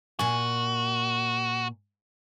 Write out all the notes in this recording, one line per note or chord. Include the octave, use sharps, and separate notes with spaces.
A#2 F#4 G#5